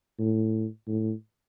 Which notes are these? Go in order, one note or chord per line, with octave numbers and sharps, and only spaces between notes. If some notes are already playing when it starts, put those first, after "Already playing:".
A2
A2